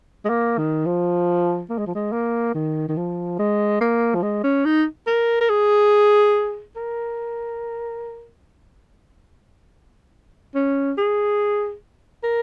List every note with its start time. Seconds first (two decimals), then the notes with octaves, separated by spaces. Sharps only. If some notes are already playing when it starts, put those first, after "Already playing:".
0.25 G#3
0.29 A#3
0.58 D#3
0.86 F3
1.70 A#3
1.78 G#3
1.87 F3
1.95 G#3
2.12 A#3
2.54 D#3
2.88 D#3
2.97 F3
3.39 G#3
3.81 A#3
4.15 F3
4.22 G#3
4.44 C#4
4.65 D#4
5.07 A#4
5.41 A#4
5.49 G#4
6.76 A#4
10.54 C#4
10.97 G#4
12.23 A#4